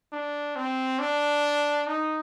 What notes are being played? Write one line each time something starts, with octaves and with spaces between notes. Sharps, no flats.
D4
C4
D4
D#4